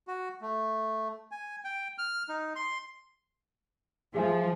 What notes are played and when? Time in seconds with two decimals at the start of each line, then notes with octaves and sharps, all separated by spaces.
0.07 F#4
0.41 A3
1.31 G#5
1.65 G5
1.98 F6
2.29 D#4
2.56 C6
4.15 F3 G#4 E5 G#5